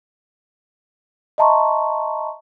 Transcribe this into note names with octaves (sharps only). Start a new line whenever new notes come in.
D#5 E5 A5 A#5 C6 C#6